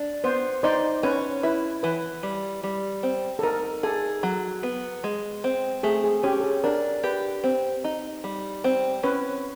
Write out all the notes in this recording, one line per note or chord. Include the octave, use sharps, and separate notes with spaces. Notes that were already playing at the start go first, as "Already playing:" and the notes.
Already playing: D4
B3 C5
D#4 C5 D5
C#4 B4 C#5
E4 B4
E3 B4
G3
G3
C4
A4
D#4 A#4
G#4 A4
F#3
B3
G#3
C4
A3 G#4
G#4
C#4 G4
A4
G#4
D4 A#4
G4 B4
C4
D#4
G3
C4
C#4 B4